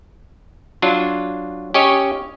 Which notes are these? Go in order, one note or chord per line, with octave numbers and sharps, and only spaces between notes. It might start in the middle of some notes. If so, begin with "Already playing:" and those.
F#3 D4 F4
C#4 G4 C#5 D#5